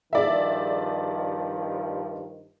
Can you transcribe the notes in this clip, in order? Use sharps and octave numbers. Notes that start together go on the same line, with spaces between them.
G2 D#3 F3 G#4 D5 E5